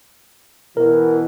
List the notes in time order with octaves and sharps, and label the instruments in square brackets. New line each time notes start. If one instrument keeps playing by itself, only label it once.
[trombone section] B2 E3 [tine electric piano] A#4